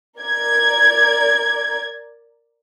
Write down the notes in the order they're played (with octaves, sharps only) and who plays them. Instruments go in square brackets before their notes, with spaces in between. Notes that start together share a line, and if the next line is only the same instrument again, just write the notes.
[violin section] A#4 D5 G#6